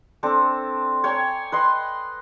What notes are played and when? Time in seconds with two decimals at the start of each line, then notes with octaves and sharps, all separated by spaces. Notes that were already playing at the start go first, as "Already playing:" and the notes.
0.23 C4 D4 A4
1.04 C#5 G5 G#5 A#5
1.52 B4 D#5 C6